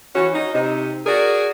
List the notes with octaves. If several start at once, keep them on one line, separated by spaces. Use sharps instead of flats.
E3 C#4 F#4
D#4
C3 D#4
F#4 G#4 A#4 D5